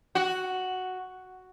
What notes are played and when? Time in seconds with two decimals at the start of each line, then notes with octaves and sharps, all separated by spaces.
0.15 F#4